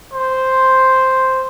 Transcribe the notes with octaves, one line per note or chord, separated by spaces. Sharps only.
C5